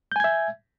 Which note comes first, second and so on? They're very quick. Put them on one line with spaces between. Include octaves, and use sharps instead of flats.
G6 G#5 G#6 E5